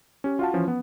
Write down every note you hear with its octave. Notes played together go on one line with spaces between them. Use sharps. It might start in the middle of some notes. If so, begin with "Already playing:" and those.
C#4 G4
F4 F#4 F5 F#5 A5
E3 F3 C#4
B3